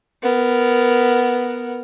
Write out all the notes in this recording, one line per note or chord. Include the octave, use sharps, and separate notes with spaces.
B3 A#4